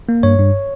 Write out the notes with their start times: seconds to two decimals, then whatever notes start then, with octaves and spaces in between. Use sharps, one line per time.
0.09 A#3
0.23 G2 C#5
0.39 G2